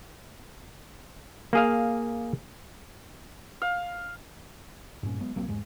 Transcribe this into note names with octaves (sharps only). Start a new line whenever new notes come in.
A#3 G#4 F5
F5
G2 A#2 C#4
F#3 G#3 B3
B1 F#3 A#3 C4
E2 G#2 G#3